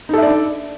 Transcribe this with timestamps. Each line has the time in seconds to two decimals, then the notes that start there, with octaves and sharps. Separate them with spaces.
0.09 D#4
0.13 A4
0.18 E5
0.22 D5
0.27 D4